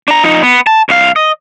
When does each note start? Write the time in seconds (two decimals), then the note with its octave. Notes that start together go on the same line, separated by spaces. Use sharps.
0.08 D4 A#5
0.24 F3 D#4
0.42 B3
0.67 A5
0.89 C2 F5
1.16 D#5